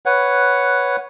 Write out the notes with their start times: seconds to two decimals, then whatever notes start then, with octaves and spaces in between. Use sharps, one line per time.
0.06 B4 C#5 F#5